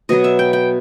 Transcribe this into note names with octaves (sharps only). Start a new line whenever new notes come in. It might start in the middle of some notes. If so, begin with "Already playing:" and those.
B2 F#3 B3 D#5
E5
G5
G5